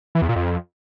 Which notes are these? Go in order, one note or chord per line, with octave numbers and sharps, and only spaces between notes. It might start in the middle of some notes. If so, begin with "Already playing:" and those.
E3
E2
A#2
F2